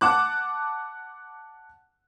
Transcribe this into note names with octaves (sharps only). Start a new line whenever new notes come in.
F#5 A5 D6 F#6